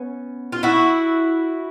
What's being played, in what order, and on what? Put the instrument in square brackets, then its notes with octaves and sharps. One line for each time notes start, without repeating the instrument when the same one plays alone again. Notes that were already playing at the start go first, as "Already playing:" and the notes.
Already playing: [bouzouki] B3 C#4
F4
E4 F#4